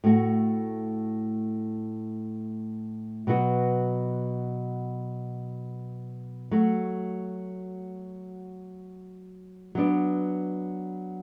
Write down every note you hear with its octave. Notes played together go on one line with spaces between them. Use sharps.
A2 A3 F#4
B2 F#3 B3 F#4
F#3 A3 F#4
F#3 B3 D4